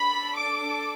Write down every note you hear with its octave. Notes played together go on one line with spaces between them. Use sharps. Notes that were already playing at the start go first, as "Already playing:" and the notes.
Already playing: D4 A4 B5
D6